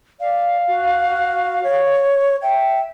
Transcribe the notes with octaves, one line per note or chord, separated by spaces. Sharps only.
D5 F5
F#4
C#5
E5 G5